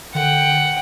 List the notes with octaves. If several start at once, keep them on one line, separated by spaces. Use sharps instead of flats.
D3 F#5 G5